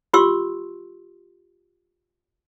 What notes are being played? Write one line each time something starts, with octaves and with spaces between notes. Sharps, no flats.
F4 G4 C6 C#6 E6